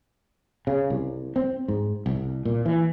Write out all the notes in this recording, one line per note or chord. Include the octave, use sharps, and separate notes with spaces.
C#3
C2
C4
G#2
C2
A#2
E3